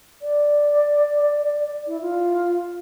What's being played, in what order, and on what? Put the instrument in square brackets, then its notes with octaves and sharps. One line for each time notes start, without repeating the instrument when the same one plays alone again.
[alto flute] D5
E4
F4